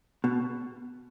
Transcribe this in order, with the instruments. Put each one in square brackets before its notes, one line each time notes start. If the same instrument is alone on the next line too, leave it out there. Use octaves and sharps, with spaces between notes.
[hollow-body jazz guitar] B2